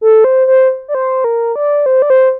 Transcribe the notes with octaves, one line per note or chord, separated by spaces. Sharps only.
A4
C5
C5
D5
C5
A#4
D5
C5
D5
C5